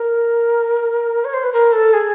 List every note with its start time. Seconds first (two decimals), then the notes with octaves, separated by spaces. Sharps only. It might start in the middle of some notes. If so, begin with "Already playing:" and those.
Already playing: A#4
1.25 C#5
1.34 C5
1.44 B4
1.53 A#4
1.73 A4
1.94 G#4